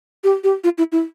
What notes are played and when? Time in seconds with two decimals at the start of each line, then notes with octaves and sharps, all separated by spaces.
0.24 G4
0.44 G4
0.64 F4
0.78 E4
0.92 E4